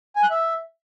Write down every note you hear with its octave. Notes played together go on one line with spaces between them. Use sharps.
G#5
F#6
E5